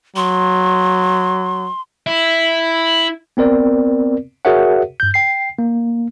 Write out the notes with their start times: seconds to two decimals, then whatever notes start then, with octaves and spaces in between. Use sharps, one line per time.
0.16 F#3 C6
2.06 E4
3.37 B3 C4 A#4 D5
4.45 F#4 G#4 A#4 C#5 E5 F#5
5.00 G2 G6
5.14 G5 C7
5.59 A#3